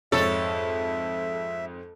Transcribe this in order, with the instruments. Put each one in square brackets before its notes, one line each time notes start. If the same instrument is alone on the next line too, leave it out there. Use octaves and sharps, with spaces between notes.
[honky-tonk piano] F2 G#2 [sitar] A4 [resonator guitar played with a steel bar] C#5 [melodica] E5